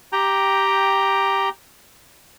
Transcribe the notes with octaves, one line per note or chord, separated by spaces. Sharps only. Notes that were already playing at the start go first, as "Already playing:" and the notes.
G4 G5 A#5